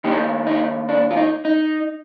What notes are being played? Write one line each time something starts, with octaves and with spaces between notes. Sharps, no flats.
D#3 A#3 D4 D#4 G4
D#4
D4
F4
D#4
D#4